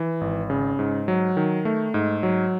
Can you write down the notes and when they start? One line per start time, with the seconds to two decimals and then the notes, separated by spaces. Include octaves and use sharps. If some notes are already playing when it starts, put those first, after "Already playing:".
Already playing: E3
0.21 G#1
0.50 C#3
0.79 G#2
1.08 F#3
1.37 D#3
1.65 A3
1.94 G#2
2.23 F#3